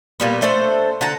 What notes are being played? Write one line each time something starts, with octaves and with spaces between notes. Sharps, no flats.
A#2 G3 B3
A3 D4 A4 C5
D3 F#5 A5 A#5